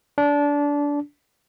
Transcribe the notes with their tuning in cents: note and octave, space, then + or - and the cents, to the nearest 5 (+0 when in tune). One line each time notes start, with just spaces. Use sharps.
D4 -20